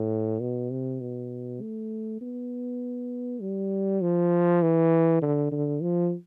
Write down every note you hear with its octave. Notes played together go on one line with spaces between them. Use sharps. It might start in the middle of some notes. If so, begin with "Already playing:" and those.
Already playing: A2
B2
C3
B2
A3
B3
G3
F3
E3
D3
D3
F3